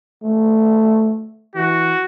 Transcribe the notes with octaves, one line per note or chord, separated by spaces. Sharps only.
A3
E3 F#4